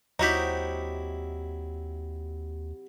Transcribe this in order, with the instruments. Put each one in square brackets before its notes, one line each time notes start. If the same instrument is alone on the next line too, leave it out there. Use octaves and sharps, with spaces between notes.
[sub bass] D#2 [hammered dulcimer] C3 [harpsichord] F#3 E4 B5 [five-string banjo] D#4 F#4 G4